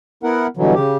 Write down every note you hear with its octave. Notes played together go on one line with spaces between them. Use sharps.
B3 E4 A#4 F#5
G2 B2 D3 E3 F#3
C#3 G4